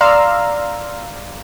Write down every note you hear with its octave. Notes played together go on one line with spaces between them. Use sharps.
D5 F5 A#5 C6 E6 F6